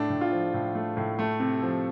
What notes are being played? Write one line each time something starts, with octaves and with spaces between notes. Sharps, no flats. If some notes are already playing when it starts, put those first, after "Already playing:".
Already playing: A2 A3 D4
A2
F4
F3
A2
A3
A2
A3
C3
F3